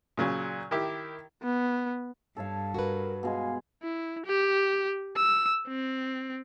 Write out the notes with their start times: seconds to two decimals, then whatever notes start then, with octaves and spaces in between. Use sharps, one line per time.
0.17 A#2 C#3 F#3
0.71 D#3 E4 G4
1.42 B3
2.37 G2 A4 C#5 F5
2.74 F#4 A#4 B4
3.23 B2 G#3 G#4 F5
3.83 E4
4.26 G4
5.17 E6
5.68 C4